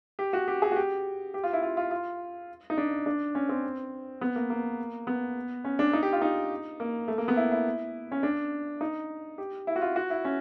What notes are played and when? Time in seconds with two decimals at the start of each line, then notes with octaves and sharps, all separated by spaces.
0.19 G4
0.33 F#4
0.48 G4
0.62 G#4
0.71 F#4
0.76 G4
1.34 G4
1.43 F4
1.53 E4
1.63 F4
1.77 F4
1.91 F4
2.70 D#4
2.77 D4
3.06 D4
3.35 C#4
3.49 C4
4.21 B3
4.36 A#3
4.50 A#3
5.07 B3
5.64 C#4
5.79 D4
5.93 D#4
6.03 G4
6.13 F4
6.22 D#4
6.80 A#3
7.08 A3
7.18 A#3
7.28 B3
7.37 E4
7.52 E4
8.12 C#4
8.23 D4
8.81 D#4
9.38 G4
9.67 E4
9.76 F#4
9.81 F4
9.96 F#4
10.10 E4
10.25 C#4